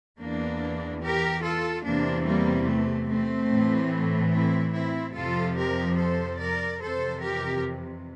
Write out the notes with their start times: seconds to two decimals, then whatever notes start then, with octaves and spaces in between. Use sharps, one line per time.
0.18 E2 E3 A#3 D4
1.02 G4 A#4
1.42 F4 A4
1.84 E2 C3 E3 A#3 D4
2.25 G3 A#3
2.66 A3
3.08 A3 C4
3.50 A2 E3
4.33 C4 E4
4.73 C4 E4
5.15 F2 C3 F3 F4 A4
5.56 G4 A#4
5.97 A4 C5
6.39 A#4 D5
6.81 F2 C3 E3 A4 C5
7.22 G4 A#4